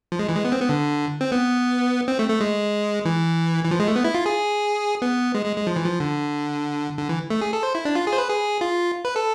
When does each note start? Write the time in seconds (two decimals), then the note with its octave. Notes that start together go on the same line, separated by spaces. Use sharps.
0.12 F3
0.19 G#3
0.29 E3
0.36 G#3
0.45 B3
0.52 C4
0.61 B3
0.69 D3
1.21 C4
1.32 B3
2.08 C4
2.19 A3
2.29 A3
2.41 G#3
3.05 E3
3.64 E3
3.71 F3
3.80 G#3
3.88 A3
3.96 B3
4.04 E4
4.15 F4
4.26 G#4
5.02 B3
5.35 G#3
5.46 G#3
5.56 G#3
5.67 F3
5.76 E3
5.86 F3
6.00 D3
6.99 D3
7.09 E3
7.30 A3
7.41 G#4
7.53 A4
7.63 C5
7.75 E4
7.85 D4
7.95 F4
8.07 G#4
8.13 C5
8.18 B4
8.28 G#4
8.61 F4
9.05 B4
9.16 A4